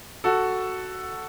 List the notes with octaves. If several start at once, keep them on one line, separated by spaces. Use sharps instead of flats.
F#4 A4